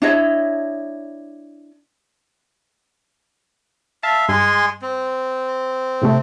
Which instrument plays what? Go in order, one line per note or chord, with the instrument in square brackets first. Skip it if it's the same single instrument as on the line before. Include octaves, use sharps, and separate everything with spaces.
[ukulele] D4 E4 C#5 D#5
[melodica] E5 F5 [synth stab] A5
[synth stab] G2 [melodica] G#3 G#5 C6
[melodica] C4
[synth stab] A2 C3 A3